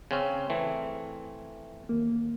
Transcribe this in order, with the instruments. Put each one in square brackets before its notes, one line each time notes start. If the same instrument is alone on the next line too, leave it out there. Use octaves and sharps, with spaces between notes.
[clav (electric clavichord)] C#3 C4 C#4
E3 A3 C4
[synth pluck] D#2 A#3